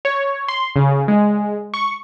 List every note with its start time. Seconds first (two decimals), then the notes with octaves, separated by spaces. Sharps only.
0.05 C#5
0.48 C6
0.76 C#3
1.08 G#3
1.74 C#6